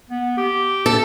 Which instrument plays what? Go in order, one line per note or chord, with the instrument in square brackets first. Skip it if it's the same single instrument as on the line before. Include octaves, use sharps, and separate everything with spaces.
[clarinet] B3
G4
[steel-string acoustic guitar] A4